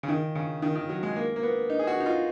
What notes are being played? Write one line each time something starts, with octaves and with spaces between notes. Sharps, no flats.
C#3
D#3
C#3
D#3
D#3
F#3
G#3
A#3
A#3
B3
D#4
G#4
F#4
D#4
F4